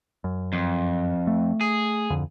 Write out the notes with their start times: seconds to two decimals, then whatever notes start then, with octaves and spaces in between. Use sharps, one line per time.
0.24 F#2
0.53 F2
1.27 A3
1.61 G#4
2.10 D1 F2 D3